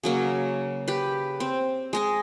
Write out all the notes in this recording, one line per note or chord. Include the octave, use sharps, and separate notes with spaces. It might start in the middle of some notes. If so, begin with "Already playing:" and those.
C#3 F#3 A#3
G4 B4
C4
G#3 D#5 G#5